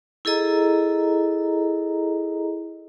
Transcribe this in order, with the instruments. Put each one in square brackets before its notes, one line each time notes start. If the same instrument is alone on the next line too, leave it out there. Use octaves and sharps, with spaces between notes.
[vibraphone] E4 G#4 A4 D#5 A#5